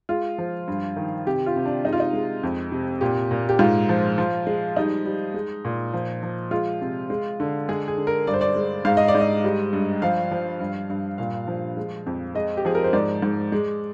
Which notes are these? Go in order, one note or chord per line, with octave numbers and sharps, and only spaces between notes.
G#3 F4
F3
G2
D#3
C3 G4
F4
C3
D4
G#3 D#4
F4
D#4
G#3
F2
C3
A#2 G4
A#2
G4
G#2 F4
F3
F3
G#3
G3 D#4
G3
G#3
A#2
F3
F3
G#3 F4
C3
G#3
D3
G#3 G#4
G#4
D3
A#4
G2 D5
C5
D5
G#3
G#2 F5
D#5
D5
G#2
D#5
G3
G2
F3 F5
F3
G2
G2
A#2 F5
F3
G#3
F2
G#3 D#5
G4
F3 G#4
A#4
C5
G#2 D5
G#2
G#3